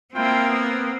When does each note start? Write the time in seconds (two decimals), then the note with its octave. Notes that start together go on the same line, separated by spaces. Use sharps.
0.14 A#3 C4 E4 F4 G5
0.49 B3